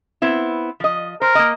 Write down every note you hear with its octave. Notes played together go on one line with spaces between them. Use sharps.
B3 C4 E4
F3 D#5
A#4 C5
A#3 D#5